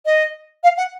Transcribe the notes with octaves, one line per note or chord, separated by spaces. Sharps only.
D#5
F5
F#5